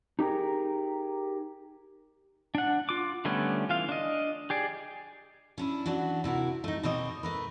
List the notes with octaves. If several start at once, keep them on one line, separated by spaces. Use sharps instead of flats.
D#4 G4 G#4 A#4
D4 F#5
F4 D6
D3 G3 A3 B3 C#4
E3 F4 F5
D4 D#5
G4 G#4 D5
C#4 D4 E4
E3 F#3 D4 F#4
C3 E4 F#4 A#4
A3 D#4
B2 A#3 C4 C#5 D#5
A3 A#4 B4